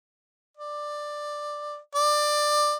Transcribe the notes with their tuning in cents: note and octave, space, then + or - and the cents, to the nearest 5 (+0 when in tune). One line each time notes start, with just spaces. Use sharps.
D5 +10
D5 +20